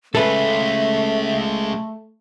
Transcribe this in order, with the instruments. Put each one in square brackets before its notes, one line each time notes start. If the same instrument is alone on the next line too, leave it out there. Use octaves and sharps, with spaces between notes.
[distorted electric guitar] G#3 C#4 [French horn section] A3 [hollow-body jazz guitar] A4 B4 [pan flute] E5